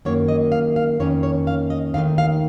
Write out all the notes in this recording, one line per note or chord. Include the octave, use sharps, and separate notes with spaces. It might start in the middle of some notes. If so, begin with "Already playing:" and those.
F#2 D#3 A#3 C#5
D#5
F5
F5
F2 D#3 A#3 C#4 C#5
C#5
F5
D#5
D#2 D#3 A3 D#4 F5
F5